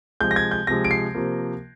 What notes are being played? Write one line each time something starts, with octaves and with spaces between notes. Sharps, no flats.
C3 F3 G#3 G6
A#6
G#6
G6
C3 F3 G#3 A#6
D7
C7
C3 F3 A#3